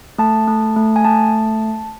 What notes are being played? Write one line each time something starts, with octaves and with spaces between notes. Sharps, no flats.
A3 A5
A3
A3
G#5
A3 A5